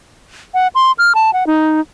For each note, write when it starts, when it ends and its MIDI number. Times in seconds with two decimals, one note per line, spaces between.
0.54 0.68 78
0.75 0.92 84
0.99 1.13 89
1.15 1.33 81
1.33 1.46 78
1.47 1.81 63